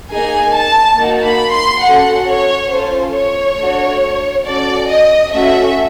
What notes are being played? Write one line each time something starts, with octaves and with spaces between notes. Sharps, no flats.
A#3 D#4 G#4 G#5
A5
A#3 D#4 F#4
B5
C6
C#4 F#4 A4 F#5
C#5
C#4 F4 A4 C5
C#5
A3 D4 F#4 A4
C#4 F#4 A4 D5
D#5
A3 C#4 F#4 A4 E5